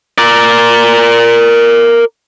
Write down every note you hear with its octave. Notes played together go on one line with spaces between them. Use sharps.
A#4 D5